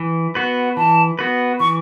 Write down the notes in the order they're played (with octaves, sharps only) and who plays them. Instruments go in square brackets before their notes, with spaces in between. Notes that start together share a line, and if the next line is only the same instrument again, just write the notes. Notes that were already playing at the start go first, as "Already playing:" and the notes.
Already playing: [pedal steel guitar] E3
B3 F#4 B4
[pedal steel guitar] E3 [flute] A5
[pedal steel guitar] B3 F#4 B4
[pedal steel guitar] E3 [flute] C#6